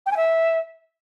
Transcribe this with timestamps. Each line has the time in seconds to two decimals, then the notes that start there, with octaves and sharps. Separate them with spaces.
0.06 G5
0.11 G#5
0.17 E5